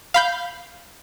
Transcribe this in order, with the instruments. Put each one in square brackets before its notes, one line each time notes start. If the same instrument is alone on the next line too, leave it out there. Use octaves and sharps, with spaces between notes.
[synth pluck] F5 B5 G6